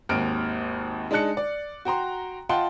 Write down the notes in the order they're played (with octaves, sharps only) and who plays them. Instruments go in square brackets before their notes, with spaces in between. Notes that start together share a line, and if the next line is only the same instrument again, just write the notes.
[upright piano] G#1 D#2 F6 D7
G#3 D4 D#4 A5 F#6 C#7
D5
F#4 G5 A#5 C6
F4 D#5 F#5 G5 A5 C6